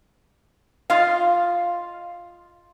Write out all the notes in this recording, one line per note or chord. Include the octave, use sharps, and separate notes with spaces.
F4 D#5 F5